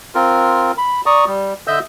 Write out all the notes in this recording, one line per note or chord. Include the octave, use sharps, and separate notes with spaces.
C4 F4 A#4
B5
D5 A#5 C#6 D#6
G3
D3 D#5 E5 E6 G6